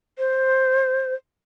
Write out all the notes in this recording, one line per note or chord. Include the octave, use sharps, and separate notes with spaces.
C5